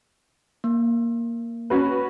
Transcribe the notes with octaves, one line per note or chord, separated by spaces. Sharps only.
A#3
C#4 F#4 B4